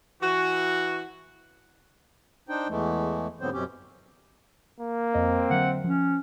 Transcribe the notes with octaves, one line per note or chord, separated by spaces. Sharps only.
E3 F#4
D4 D#4 C5 G5
E2 E3 G#3 A3
G#2 D3 F#3 B3 C4 C5
F#2 B2 C4 C#4 G4
A#3
F2 C4 D#5
D3 F#3 E5 F#5
F3 C#4